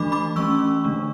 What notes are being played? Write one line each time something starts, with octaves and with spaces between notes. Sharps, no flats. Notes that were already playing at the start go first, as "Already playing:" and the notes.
Already playing: E3 A3 D4 B5 D6
B5 D6
E3 A3 C#4 C#6 E6
D3 A3 D4